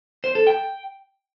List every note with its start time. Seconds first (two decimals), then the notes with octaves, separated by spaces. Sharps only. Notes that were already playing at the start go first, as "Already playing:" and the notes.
0.24 C5
0.35 A4
0.47 G5